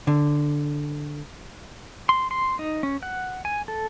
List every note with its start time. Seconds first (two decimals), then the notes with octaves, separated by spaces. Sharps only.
0.07 D3
2.09 C6
2.31 C6
2.59 D#4
2.83 C#4
3.03 F#5
3.45 G#5
3.68 A4